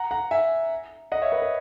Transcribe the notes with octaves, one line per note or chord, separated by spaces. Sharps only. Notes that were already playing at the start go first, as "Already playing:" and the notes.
Already playing: F#5 A#5
F#5 A#5
E5 G#5
D#5 F#5
C#5 E5
B4 D#5
B4